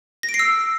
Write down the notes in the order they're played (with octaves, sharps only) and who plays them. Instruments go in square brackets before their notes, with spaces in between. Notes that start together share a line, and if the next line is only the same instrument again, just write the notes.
[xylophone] A#6
D7
C7
E6